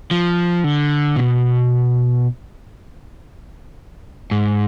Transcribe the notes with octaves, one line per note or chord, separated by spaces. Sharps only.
F3
D3
B2
G#2